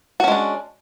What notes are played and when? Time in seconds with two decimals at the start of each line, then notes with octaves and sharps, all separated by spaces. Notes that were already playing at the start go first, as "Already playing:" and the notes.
0.20 F#4
0.24 C#4
0.28 G#3
0.32 D4